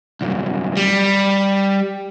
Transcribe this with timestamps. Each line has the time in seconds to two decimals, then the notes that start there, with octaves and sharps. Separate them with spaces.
0.21 C2 F#2
0.77 G3